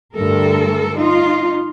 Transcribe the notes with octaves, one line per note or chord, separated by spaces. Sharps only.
D2 G2 A4 A#4
D#4 F4